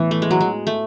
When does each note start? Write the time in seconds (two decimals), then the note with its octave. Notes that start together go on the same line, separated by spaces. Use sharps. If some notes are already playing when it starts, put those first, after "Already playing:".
Already playing: A2 E3 B3
0.11 A3
0.22 G#3
0.31 F#3
0.41 G#3
0.67 A3